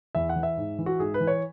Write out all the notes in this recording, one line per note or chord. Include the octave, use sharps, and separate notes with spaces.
E2 E5
F#5
E3
E5
G#2
E3
F#4
G#2 G#4
B4
E3
C#5